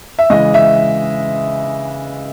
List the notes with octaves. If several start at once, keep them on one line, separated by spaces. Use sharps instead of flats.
E5
C#3 E3 G#3 D#5
E5